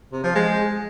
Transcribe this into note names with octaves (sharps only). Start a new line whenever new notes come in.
C3
F3
G#3